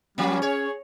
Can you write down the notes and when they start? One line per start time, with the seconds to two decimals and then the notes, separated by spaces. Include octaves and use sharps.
0.18 F3 G3 A#3 C#4
0.42 G#4 C#5